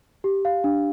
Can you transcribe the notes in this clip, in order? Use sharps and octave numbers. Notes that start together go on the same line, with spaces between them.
G4
F5
D4